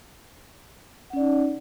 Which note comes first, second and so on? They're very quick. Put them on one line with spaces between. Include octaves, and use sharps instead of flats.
F#5 C#4 D5 D#4